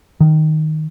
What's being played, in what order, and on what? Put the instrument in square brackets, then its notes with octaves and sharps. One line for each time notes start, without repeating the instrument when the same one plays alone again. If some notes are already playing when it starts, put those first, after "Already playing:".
[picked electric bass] D#3